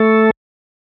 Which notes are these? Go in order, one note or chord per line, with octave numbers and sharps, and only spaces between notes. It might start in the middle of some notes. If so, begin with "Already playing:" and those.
Already playing: A3 A4